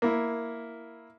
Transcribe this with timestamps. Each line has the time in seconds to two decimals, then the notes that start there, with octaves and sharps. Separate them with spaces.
0.02 A#3 E4